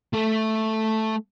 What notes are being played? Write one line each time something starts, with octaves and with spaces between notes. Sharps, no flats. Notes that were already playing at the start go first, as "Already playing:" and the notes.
A3 A4